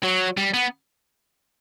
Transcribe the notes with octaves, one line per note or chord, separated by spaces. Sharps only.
F#3
G3
B3